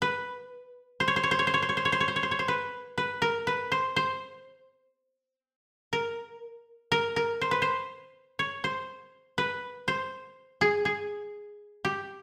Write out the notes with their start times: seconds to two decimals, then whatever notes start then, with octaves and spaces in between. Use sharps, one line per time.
0.02 B4
1.00 C5
1.08 C#5
1.16 C5
1.23 C#5
1.31 C5
1.39 C#5
1.47 C5
1.54 C#5
1.62 C5
1.69 C#5
1.77 C5
1.85 C#5
1.92 C5
2.00 C#5
2.08 C5
2.16 C#5
2.23 C5
2.31 C#5
2.39 C5
2.48 B4
2.98 B4
3.22 A#4
3.47 B4
3.72 C5
3.96 C5
5.93 A#4
6.92 A#4
7.16 A#4
7.41 C5
7.51 B4
7.62 C5
8.39 C#5
8.64 C5
9.38 B4
9.88 C5
10.61 G#4
10.85 G#4
11.85 G4